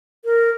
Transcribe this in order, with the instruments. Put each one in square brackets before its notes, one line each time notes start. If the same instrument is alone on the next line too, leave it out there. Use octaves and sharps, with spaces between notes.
[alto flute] A#4